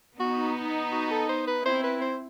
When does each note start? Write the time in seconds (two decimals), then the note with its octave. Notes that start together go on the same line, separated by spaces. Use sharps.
0.18 B3 D#4 F#4
0.92 F#4
1.11 A4
1.29 C5
1.47 B4
1.65 C4 E4 C5
1.83 B4
2.01 C5